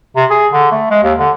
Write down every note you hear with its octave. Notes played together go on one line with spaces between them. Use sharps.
C3
G#4
D3
A3
G#3
D#2
D3